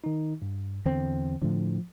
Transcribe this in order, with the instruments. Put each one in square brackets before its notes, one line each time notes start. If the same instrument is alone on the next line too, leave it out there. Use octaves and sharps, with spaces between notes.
[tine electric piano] D#3 D#4
G2
[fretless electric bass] E2 C4 [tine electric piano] D3
[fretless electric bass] A2 D3 [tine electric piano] F3